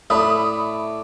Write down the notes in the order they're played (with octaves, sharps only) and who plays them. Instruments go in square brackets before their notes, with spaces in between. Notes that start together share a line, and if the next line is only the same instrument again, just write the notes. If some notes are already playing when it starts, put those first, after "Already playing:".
[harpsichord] A2 [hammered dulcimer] A3 D5 [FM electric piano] E5 [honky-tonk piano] B5 D#6